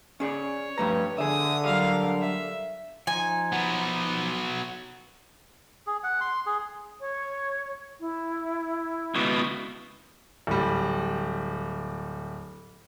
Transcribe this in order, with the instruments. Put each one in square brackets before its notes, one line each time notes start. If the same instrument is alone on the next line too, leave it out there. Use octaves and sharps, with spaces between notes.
[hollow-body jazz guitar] C#4 G#4 D5 [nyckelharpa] C#5
[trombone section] G2 B4 [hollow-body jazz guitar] F3 A3 A#5
[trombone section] D3 [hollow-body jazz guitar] G#4 E5 [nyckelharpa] D#6
[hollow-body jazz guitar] F#3 G3 [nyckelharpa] A#4 F5
[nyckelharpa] E5
[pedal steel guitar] F3 D#4 [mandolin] G#5
[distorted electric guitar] F#3 B3
[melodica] G#4
F#5
C6
G#4
[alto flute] C#5
E4
[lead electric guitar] C#2 B2
[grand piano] D1 G3